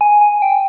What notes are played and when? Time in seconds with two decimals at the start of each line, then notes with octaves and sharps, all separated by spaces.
0.01 G#5
0.21 G#5
0.42 G5